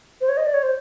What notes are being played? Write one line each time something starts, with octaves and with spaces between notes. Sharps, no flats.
C5
C#5
D#5
D5
C#5
C5